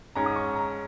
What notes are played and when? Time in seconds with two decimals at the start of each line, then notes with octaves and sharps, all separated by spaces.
0.16 G#2 G#3 C#4 A#5
0.26 D#6
0.36 C#6
0.56 A#5